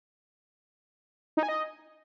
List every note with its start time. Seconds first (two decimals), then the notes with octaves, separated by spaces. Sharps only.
1.37 D#4
1.43 G#5
1.49 D#5